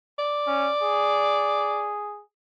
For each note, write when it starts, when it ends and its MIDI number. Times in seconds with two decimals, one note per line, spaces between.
0.19 1.91 74
0.47 0.69 61
0.83 2.23 68